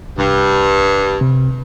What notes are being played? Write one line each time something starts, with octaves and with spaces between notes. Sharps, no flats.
C2 G2
C3